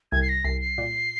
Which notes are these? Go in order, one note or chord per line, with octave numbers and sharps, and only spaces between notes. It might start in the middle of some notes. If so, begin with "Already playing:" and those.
C2 G#6
C7
A#6
C2 C7
C7
A#2